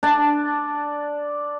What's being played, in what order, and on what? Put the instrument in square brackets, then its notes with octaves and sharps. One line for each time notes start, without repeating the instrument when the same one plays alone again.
[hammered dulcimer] D4 A5